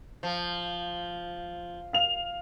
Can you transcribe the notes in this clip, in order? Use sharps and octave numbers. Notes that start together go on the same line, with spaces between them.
F3
F5 F7